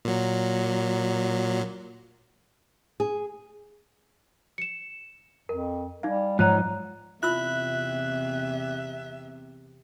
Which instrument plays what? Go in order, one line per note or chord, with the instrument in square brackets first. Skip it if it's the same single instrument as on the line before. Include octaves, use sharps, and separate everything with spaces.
[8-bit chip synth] A#2 F#3
[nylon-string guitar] G#4
[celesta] C#7 E7
[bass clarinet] F2 [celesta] A#4
[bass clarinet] G3 [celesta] D#4 F5
[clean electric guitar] G#2 F3 D#4 [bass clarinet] F#3 [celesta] A#5 F#6
[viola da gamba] E2 C3 C4 [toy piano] E4 F4 E6 [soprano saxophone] E5 [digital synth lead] F#6